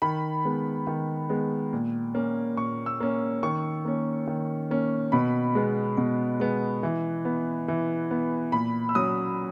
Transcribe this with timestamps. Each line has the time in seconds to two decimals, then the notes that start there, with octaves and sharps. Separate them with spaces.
0.02 D#3 B5
0.45 G#3 B3
0.87 D#3
1.29 G#3 B3
1.73 A#2
2.14 A#3 C#4
2.57 A#2 C#6
2.86 E6
3.00 A#3 C#4
3.43 D#3 C#6
3.85 A#3 C#4
4.27 D#3
4.71 A#3 C#4
5.12 B2 B5
5.55 G#3 B3
5.97 B2
6.40 G#3 B3
6.83 E3
7.25 B3
7.68 E3
8.11 B3
8.52 A#2 B5
8.89 E6
8.95 F#3 C#4 D#6